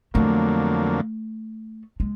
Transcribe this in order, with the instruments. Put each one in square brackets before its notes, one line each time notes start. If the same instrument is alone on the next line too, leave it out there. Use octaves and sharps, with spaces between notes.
[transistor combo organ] F2 D3 F#3 A#3 [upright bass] A3
[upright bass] G#3